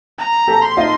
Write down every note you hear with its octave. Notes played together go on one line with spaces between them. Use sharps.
A#5
G4 A4
C6
D#4 F4